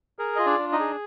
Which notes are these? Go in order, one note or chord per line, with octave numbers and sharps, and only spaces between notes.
G#4 A#4
F4 D#5
D4 D5
D4
D#4 D#5
G#4